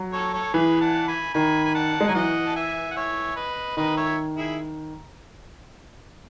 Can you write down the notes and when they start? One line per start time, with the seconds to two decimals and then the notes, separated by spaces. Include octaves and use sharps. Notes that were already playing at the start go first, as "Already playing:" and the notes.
Already playing: F#3
0.13 A4 C#5
0.33 A4 C#5
0.53 E3 G#4 B4
0.81 F#5 A5
1.08 G#5 B5
1.34 D#3 G#5 B5
1.64 G#5
1.75 F#5 A5
2.01 G#3
2.07 F#3 G#5
2.15 E3 D#5 F#5
2.46 A5
2.56 E5 G#5
2.91 F#5
2.96 C#5 E5
3.36 B4 D#5
3.77 D#3 B4 D#5
3.97 C#5 E5
4.37 E4 G#4